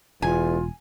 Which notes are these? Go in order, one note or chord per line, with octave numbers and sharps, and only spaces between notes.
E1 E2 F4 G#5